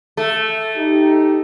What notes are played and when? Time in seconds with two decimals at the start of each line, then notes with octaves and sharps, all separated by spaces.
0.17 A3
0.77 D#4 G4